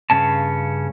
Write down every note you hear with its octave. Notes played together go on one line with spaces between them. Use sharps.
G2 C#3 C#4 A5